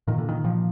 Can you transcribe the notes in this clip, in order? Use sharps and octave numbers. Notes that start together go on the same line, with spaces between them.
A#2 D#3
D3
D#3
A#2 F3